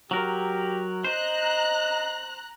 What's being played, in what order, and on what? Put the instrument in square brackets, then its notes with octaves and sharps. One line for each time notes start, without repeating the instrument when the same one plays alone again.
[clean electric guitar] F#3 A#4 [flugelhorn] G4
[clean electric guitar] C5 [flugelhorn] D#5 [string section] A#5 F#6